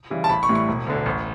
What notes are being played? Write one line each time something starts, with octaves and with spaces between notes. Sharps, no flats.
C#3 E3 G3
A5
A1 B5
C#6
A2 E3 G3
C#6
E1
D2 D3
A1